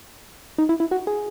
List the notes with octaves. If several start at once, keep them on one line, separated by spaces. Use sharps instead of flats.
D#4
E4
E4
F#4
G#4